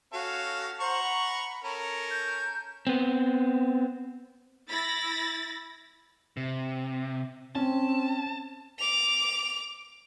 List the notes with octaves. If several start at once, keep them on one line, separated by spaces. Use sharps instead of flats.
C#4 F#4 A4 F5
C5 F#5 A#5 C#6
B5
C#4 A4 A#4
G6
B3 C4
E4 B5 A6 A#6
C3
C4 C#4 A5
D6 F7